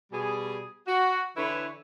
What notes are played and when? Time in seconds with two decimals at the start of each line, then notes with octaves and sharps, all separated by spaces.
0.12 B2 G3 G#4
0.86 F#4
1.36 D3 E3 E4 B4 C#5